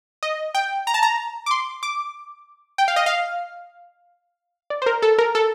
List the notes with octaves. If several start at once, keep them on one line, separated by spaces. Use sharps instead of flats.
D#5
G5
A#5
A5
A#5
D6
C6
D6
G5
F5
D#5
F5
D5
C5
A#4
A4
A#4
A4